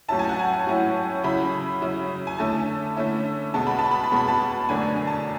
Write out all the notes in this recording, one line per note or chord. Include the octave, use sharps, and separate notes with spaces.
A2 F#3 C#4 E4 A5
G#5
F#5
G#5
A2 F#3 C#4 E4
C#3 F#3 C#4 E4 B5
C#3 F#3 C#4 E4
G#5
D3 A3 C#4 E4 A5
D3 A3 C#4 E4
B2 G#3 B3 A5
B5
A5
B5
A5
B2 G#3 B3 B5
A5
F#2 D3 A3 D4 G#5
A5